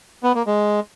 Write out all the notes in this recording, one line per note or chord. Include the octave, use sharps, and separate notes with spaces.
B3
A#3
G#3